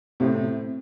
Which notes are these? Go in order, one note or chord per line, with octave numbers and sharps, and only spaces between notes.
A2 C3